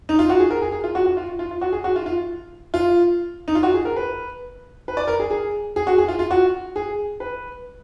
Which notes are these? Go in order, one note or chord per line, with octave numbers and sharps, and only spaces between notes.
D#4
F4
F#4
G#4
A#4
G#4
G#4
F4
F#4
F#4
F4
F4
F4
F#4
G#4
F#4
F4
F4
F4
D#4
F4
F#4
G#4
A#4
B4
B4
D5
A#4
G#4
G#4
G#4
F#4
G#4
F4
F4
F#4
G#4
B4